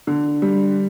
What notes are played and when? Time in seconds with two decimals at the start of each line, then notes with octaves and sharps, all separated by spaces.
0.07 D3
0.42 G3